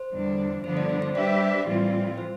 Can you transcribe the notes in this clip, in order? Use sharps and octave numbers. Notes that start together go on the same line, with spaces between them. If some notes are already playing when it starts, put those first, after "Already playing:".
Already playing: C5
E2 D3 G3 D4
G2 D3 F3 B3 D4 C5
D5
C5
C5
G3 D4 G4 B4 D5 E5
C5
D5
A2 E3 G3 C4 F4
C5